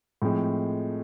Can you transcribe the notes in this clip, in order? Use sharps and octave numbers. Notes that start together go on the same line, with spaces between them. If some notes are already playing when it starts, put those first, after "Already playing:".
A2 F3 G#3 C4